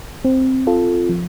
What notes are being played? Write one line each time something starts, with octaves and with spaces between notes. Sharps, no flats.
C4
F4 A4
F3